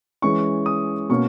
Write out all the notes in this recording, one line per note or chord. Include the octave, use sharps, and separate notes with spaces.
E3 G#3 C#4 C#6
D#6
B2 A#3 C#4 C#6